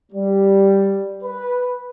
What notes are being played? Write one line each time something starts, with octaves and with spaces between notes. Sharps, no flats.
G3
B4